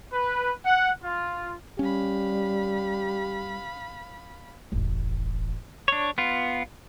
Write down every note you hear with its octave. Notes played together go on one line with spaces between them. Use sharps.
B4
F#5
F4
G3 C#4 G4 F5 B5
E1 A1
D4 C#5
B3 F4